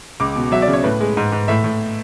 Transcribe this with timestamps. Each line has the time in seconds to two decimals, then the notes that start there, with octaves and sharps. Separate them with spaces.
0.20 C#2 D6
0.36 B2
0.52 F#3 E5
0.62 D5
0.68 C#3
0.73 C#5
0.84 A2 B4
1.01 G#3
1.17 G#2
1.32 G#2
1.48 A2 E5
1.64 A2